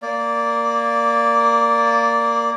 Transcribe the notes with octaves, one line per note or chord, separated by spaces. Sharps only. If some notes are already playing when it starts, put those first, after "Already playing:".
A#3 D5